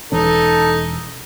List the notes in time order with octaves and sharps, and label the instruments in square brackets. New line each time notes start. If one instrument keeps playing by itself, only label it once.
[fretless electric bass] E1 E3 C#4 [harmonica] D#4 [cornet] A4